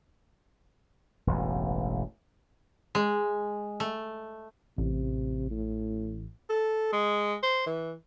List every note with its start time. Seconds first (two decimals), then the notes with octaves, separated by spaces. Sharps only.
1.27 E1 A1 G2
2.95 G#3
3.80 A3
4.78 A1 C3
5.51 A2
6.49 A4
6.93 G#3
7.43 C5
7.66 E3